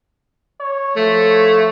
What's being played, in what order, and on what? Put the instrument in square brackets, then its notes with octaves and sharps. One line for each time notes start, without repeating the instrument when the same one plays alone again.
[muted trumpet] C#5
[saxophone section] F3 A3